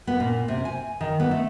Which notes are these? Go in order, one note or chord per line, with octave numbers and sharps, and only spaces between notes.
B3
A#2
C3
G#5
D#3
B3
A3